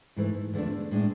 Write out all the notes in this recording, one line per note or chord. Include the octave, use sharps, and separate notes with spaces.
G#2 E3 A3
E2 D3 F3 A3 D4
A2 G#3 D4